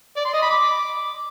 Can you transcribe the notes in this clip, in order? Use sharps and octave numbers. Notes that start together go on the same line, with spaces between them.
D5
C6
D#5
B5
D6